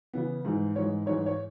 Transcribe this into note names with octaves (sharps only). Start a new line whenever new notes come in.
C#3 E3 B3
G#2 E3 G#3
G#2 E3 G#3 C#5
G#2 E3 G#3 C#5
C#5